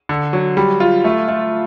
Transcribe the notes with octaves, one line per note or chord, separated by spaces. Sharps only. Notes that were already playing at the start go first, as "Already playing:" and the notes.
D3
F#3
G3
F4
A3
A3